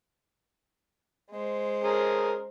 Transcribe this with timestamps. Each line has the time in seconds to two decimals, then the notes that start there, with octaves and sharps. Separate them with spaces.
1.31 G#3 C5
1.84 C#4 G#4 A#4